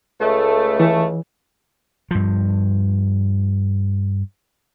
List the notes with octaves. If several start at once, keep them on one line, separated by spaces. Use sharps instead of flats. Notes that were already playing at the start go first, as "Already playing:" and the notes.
C#2 A3
E3 A3
G2 F3